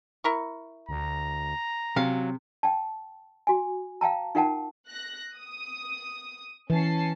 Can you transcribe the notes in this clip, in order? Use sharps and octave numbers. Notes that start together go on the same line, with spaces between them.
E4 A#4 C#6
D2 A#5
C3 F#3 C#4 F5
G5 A5
F#4 G#5
F5 G5 A5 A#5
D#4 F4 A#4 F#5 G5 A5
F#6 A#6
D#6
E3 C#4 A5 C7